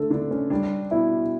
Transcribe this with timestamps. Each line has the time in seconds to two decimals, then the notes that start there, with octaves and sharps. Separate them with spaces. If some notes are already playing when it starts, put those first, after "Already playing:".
Already playing: D3 A3 A4
0.10 D3 D4
0.31 C#4
0.50 G3 D4
0.91 B2 E4